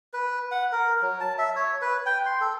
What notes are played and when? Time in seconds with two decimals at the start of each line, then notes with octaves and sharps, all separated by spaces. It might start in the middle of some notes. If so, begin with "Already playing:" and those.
0.13 B4
0.51 F#5
0.72 A#4
1.02 F#3
1.20 A5
1.38 E5
1.56 C#5
1.81 B4
2.06 G5
2.26 C6
2.41 A4